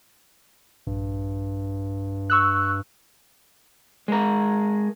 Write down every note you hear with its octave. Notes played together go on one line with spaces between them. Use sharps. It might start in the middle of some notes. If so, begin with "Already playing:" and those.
A#1 G2
C#6 E6 F#6
G#3 A#4